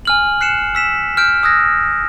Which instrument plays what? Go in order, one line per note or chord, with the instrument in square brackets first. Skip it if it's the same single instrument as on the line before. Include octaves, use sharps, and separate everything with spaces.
[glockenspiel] G#5 F6 F#7
F#6 C7 C#7 E7
E6 B6 E7
F6 G6 D7
D#6 E6 F#6 G#6 A#6